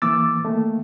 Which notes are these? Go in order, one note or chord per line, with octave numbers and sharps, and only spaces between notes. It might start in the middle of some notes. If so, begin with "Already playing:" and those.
E3 A#3 D6 E6 A6
D#3 A3 A#3